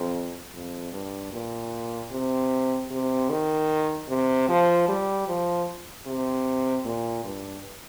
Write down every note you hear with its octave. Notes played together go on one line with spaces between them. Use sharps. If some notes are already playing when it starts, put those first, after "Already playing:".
Already playing: F2
F2
G2
A#2
C3
C3
D#3
C3
F3
G3
F3
C3
A#2
G2